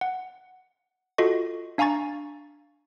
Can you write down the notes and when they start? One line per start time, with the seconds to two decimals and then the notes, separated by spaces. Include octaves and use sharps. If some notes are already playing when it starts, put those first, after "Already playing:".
0.01 F#5
1.18 F4 F#4 A4 D#5 C#6
1.78 D4 F5 G#5 A#5 C#6 A6